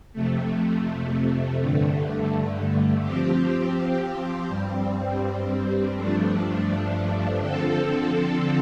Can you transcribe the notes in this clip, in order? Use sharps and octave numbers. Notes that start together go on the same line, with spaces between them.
F2 C3 A3
G2 D3 A3
F3 C4 G4
G2 G3 C4
G2 F3 A3 D4
D3 F3 C4 A4